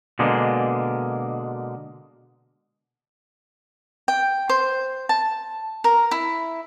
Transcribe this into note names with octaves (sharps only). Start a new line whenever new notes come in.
B2 D3 G#3 A#3
G5
C5
A5
A#4
E4